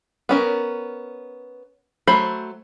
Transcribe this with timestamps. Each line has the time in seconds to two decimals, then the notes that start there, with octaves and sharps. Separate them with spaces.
0.29 B3 C#4 A#4
2.07 F#3 A3 C5 B5